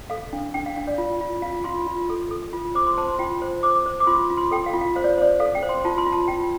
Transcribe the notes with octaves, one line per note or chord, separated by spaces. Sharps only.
A4 F5
D4
D4 G5
F5
D4 F5
D5
F4
F4
F4 F5
F4 C6
F4
A4
A4
F4
C5 D6
C6
C5 A5
C6
F4 G5
C5
C5 D6
C5
D6
F4 C6
F4
C6
A4 G5
F5
F4
F5
C5 F5
D5
C5 D5
A4 F5
G5
C5
C6
F4 A5
C6
F4
A5
F4 G5